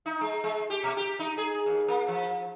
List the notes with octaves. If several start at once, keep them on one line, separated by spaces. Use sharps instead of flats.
D#4
G#3
G#3
G4
B2
G4
D#4
G#4
D#2
A#3
F3